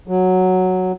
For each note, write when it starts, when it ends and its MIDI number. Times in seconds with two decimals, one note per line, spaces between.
0.08 0.92 54